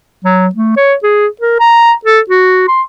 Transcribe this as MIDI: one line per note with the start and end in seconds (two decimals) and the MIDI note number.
0.25 0.47 54
0.55 0.72 57
0.77 0.94 73
1.03 1.27 68
1.41 1.56 70
1.60 1.92 82
2.05 2.20 69
2.30 2.66 66
2.68 2.82 84